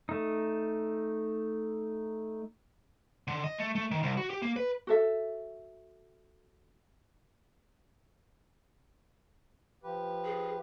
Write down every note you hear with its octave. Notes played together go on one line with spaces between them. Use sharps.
A3 D#4
D3
D#5
A3
A3
D#3
C2
F#4
G4
A#3
B4
F#4 A4 E5
F3 G4 B4
G#4